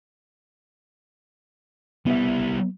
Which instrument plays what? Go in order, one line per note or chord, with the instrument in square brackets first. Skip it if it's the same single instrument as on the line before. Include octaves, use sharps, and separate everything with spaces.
[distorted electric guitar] G3 E4 [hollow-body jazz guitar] B3 E5